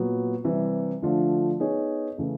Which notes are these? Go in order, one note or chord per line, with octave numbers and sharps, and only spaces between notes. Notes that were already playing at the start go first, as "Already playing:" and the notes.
Already playing: A#2 F#3 B3
C3 E3 G3
D3 F3 A3 D4 F4
B3 D#4 G#4 C#5
C#3 E3 A3